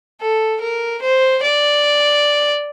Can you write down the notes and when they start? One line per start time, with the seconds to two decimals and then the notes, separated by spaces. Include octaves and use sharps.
0.21 A4
0.61 A#4
1.02 C5
1.43 D5